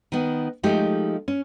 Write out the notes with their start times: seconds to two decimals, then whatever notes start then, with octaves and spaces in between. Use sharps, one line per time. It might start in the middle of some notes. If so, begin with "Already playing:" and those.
0.12 D#3 B3
0.63 F3 G#3 A3 D#4 G4
1.28 C#4